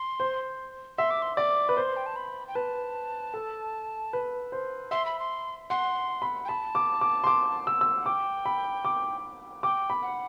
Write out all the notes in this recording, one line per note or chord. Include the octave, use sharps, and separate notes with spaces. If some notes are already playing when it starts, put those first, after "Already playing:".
Already playing: C6
C5
E5 C6
D6
C6
D5 D6
B4 B5
C5 C6
G5
A5
B5
G5
B4 A5
A4
B4
C5
E5 C6
B5
C6
F#5 C6
B5
G5
A5 B5
D6
D6
C6
D6
E6
E6
F#5
G5 D6
B5
D6
G5 D6
B5
F#5